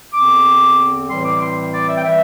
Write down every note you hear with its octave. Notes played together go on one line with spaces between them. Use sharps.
E2 D3 C4 D6
A2 E3 G3 C4 C6
D6
C6
D5
E5
G5
E3 G3 E5